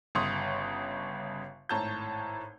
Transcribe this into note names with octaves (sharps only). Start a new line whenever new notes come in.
G1 C#3 C6 C#6 D#6
G#1 A2 C#5 A5 A#5 G6